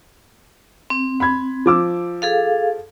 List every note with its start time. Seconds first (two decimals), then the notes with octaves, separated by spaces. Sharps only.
0.90 C4
1.20 B5 G#6
1.66 F3 D6 E6
2.22 G#4 A4 F5